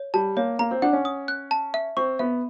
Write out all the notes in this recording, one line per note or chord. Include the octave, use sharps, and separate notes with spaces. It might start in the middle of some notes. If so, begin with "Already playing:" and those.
Already playing: C#5
G3 A5
A#3 C#5
A#3 A#5
C4
D4 F#5
C#4
D#6
F#6
A5
E5
C4 C#6
B3 E5